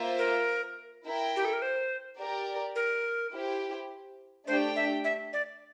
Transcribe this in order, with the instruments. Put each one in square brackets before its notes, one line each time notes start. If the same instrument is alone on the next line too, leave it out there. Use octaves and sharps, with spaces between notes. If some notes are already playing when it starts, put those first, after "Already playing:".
Already playing: [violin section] A#3 F4 C5 E5
[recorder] A#4
[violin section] E4 A#4 E5 G5
[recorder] G4
A4
A#4
C5
[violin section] G4 A#4 D5
[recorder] A#4
[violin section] E4 G4 C5
[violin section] A3 D4 G4 D5 G5 [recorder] C5
[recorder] E5
E5
D5